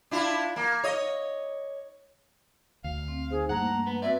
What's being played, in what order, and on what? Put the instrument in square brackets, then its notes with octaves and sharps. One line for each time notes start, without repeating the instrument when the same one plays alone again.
[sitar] D4 E4 F4
A#3
C#5 D#5
[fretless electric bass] D2 [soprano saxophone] F5
[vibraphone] C4
[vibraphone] D#4 C5 [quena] G#4
[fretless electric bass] G2 [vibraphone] A3 A#3 [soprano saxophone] F#5 [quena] A#5
[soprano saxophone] B3
[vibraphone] C4 F#4 B4 [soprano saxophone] D5 [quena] E5